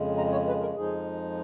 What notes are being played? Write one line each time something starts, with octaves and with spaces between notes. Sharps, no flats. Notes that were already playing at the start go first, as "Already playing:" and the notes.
Already playing: F2 C#3 G#3
A#5
C#5
B4
A#4
F2 F3 G#3 D#4 G#4